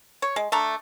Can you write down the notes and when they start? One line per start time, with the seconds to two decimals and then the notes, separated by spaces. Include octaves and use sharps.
0.22 C#5
0.36 G#3
0.52 A3 D4 A#5